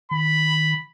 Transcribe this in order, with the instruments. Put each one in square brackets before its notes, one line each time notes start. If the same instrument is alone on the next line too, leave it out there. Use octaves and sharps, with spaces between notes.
[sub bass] D#3 [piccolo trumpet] B5